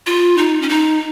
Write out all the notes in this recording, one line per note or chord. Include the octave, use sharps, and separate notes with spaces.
F4
D#4
C#4
D#4